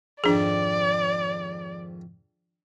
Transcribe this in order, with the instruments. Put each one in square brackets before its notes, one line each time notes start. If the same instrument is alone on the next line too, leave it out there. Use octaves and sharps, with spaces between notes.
[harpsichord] F2 G#2 D#3 [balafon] D4 G#4 [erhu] D5